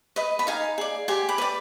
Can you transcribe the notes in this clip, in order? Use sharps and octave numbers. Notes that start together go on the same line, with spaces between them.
B4 D#5
B5
D#4 F5 G#5
G#4 D5
G4 G#5 C6
B5 D6
B4 D5